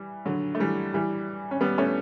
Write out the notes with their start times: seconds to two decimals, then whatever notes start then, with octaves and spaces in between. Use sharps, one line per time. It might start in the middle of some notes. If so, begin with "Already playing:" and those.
Already playing: E3 G3
0.26 D3 F#3
0.55 A3
0.60 E3 G3
0.94 E3 G3
1.51 C#4
1.61 G3 B3
1.78 A3 C#4